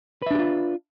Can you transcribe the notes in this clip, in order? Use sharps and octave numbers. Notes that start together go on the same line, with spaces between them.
D4 F4 G4 B4 E5